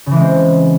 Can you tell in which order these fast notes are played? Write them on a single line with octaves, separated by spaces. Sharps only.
C#3 E3 G#3 C4